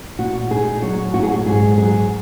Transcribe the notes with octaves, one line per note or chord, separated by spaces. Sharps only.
A#2 F#4
D#4 G#4
F#3 F#4
A#2 F#4
G#4
F#4
G#2 G#4
F#3 G#4